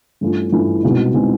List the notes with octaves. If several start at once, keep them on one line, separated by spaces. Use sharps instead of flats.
G2 E3 A3 C#4 F4
G2 E3 A3 C#4 F4
C2 B2 G#3 C4 D#4
B2 G#3 C4 D#4